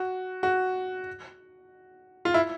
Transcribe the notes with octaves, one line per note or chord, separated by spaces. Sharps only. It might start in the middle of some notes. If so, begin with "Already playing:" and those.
Already playing: F#4
F#4
F4
E4